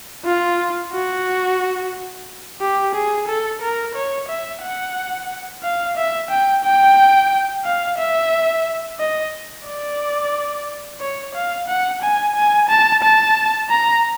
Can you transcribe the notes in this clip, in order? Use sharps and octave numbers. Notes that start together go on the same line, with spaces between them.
F4
F#4
G4
G#4
A4
A#4
C#5
E5
F#5
F5
E5
G5
G5
F5
E5
D#5
D5
C#5
F5
F#5
G#5
G#5
A5
A5
A#5